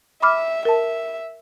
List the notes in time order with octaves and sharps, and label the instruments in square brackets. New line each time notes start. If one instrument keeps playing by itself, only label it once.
[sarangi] E5 [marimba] B5 D6 F6
[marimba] A#4 A5 [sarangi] E5